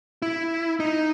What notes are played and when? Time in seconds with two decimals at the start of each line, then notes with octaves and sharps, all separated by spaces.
0.22 E4
0.80 D#4